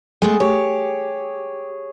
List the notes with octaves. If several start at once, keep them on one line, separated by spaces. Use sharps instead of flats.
G#3 A3 B3 G#4
G4 C#5